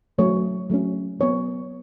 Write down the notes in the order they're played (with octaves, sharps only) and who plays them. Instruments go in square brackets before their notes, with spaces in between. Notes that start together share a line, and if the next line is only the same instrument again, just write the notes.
[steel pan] F#3 A3 C#4 C#5
F#3 A3 C#4
F#3 B3 C#5